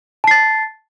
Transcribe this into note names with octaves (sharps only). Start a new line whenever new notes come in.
A5 A6 C7